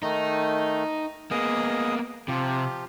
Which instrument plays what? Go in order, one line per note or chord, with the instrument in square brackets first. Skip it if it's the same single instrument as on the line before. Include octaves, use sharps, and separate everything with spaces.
[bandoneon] D#3 A3 [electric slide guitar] D#4
[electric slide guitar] A#3 B3 [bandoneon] G#4 D#5 D#6
[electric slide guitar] C3 [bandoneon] F3 F4 G4